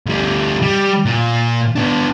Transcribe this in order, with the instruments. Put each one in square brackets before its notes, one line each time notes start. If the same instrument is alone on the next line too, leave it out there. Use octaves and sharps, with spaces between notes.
[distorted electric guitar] D2 G3
G3
A#2
B3 D4